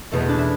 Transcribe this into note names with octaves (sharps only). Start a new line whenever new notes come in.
E2 B2 A3
B3
D4
E4